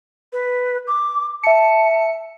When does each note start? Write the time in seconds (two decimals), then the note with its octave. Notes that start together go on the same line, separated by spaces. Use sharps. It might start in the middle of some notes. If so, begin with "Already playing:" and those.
0.33 B4
0.87 D6
1.43 E5 A5 C#7